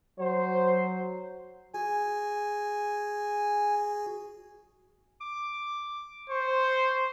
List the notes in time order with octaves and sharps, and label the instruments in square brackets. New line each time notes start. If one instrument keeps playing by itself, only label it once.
[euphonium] F#3 [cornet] C5
[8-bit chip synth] F#4 G#4 [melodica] G#5
[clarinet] D6
[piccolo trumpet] C5 [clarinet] C#6